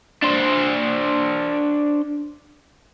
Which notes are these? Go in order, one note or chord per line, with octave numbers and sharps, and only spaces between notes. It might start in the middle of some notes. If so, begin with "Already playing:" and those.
D4 C5